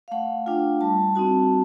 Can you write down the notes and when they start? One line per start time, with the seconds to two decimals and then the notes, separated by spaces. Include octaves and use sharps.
0.08 F5
0.11 A3 F#5
0.46 D4 F4 G5
0.81 G3 A5
1.15 C4 D#4 F#4 A5